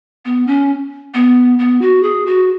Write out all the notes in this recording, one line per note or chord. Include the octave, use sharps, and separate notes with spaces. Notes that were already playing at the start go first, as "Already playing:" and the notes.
B3
C#4
B3
B3
F#4
G#4
F#4